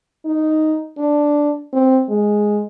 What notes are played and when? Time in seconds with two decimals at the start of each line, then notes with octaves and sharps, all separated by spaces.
0.26 D#4
0.98 D4
1.73 C4
2.09 G#3